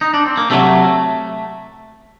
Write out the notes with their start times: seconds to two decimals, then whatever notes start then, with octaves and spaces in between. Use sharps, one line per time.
0.01 D#4
0.14 D4
0.26 C4
0.37 A#3
0.50 C3 D#3 F#3 A3